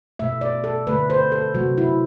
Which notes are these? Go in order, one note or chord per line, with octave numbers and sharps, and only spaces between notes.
B2 A3 E5
D5
A4
D3 A3 B4
C5
A4
C3 F#3 A3 F#4
E4